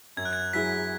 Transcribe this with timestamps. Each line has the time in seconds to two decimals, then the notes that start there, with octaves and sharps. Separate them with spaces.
0.17 F#2 G#6
0.25 F#6
0.33 G#6
0.53 F#3 E4 G#4 B6